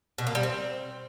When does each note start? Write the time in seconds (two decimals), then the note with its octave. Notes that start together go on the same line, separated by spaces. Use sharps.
0.18 B2
0.27 A#3
0.35 G3
0.43 C4